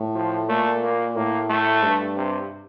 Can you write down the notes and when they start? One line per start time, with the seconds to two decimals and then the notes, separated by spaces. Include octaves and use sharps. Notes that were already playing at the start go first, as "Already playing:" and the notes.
Already playing: A2
0.15 F3
0.49 A#2 A3
0.83 A#3
1.16 A2 A#3
1.50 A3
1.83 G2
2.17 C3